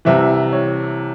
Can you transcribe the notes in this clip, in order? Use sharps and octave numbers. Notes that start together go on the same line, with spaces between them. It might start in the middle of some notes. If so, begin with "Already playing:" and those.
C2 C3 E3 E5
C#5